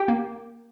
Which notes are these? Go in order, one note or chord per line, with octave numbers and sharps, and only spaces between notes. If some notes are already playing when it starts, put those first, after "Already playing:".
Already playing: G4 G5
A#3